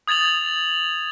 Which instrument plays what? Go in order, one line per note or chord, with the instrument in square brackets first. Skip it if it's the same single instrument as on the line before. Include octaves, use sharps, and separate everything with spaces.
[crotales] D#6 G#6 A6 F7 F#7